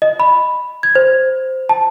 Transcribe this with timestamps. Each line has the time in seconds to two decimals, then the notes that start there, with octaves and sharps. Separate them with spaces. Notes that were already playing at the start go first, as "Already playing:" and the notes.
0.02 D#5
0.20 B5
0.83 G#6
0.95 C5
1.69 A5